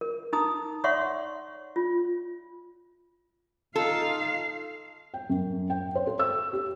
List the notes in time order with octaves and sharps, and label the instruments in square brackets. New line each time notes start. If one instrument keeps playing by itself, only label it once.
[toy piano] A#4
D#4 A#5 D#6
C#5 D5 E5 F#5 C6 C#6
F4
[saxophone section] D#4 F4 [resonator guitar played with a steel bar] A4 [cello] F5
[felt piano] G5
F#2
G5
C5
A4
E6
G4